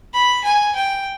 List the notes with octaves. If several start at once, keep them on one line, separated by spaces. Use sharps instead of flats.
B5
G#5
G5